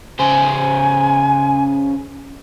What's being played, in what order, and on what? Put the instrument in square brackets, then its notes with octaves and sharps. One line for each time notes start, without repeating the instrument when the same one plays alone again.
[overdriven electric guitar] C#3 C5 [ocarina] G#5